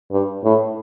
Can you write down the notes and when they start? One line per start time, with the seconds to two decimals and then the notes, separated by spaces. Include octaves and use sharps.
0.12 G2
0.44 A2